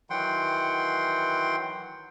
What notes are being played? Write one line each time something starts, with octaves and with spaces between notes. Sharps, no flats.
D#3 E3 F#3 F#5 G5 C6